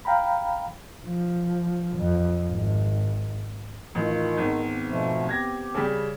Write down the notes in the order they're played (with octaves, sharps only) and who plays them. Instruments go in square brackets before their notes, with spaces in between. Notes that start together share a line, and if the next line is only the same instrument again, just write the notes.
[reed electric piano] F5 G5 A#5 B5
[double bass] F3
F2
G#1
[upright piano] A1 [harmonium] D#3 [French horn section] F4
[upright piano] G#1 [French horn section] B3 C4
[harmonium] B2 F3 A3
[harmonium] G4 [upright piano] G#6 A#6
[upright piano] C#3 G3